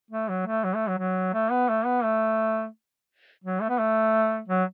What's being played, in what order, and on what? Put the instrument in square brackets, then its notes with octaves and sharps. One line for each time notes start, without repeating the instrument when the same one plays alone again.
[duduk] A3
F#3
A3
F#3
A3
F#3
F#3
A3
B3
A3
B3
A3
F#3
A3
B3
A3
F#3